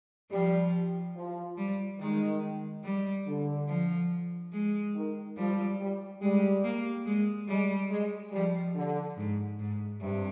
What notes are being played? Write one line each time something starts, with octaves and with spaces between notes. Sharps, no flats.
F3 G3
F3
G3
D#3 G#3
G3
D3
F3
G#3
D#3
F3 G3
G3
G3 G#3
A#3
G#3
G3 G#3
G#3
F3 G3
D3
G#2
G#2
G2 C3